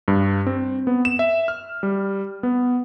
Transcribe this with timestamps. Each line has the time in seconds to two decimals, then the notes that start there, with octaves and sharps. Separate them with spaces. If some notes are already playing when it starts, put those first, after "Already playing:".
0.08 G2
0.47 C4
0.87 B3
1.05 E7
1.19 E5
1.48 F6
1.83 G3
2.43 B3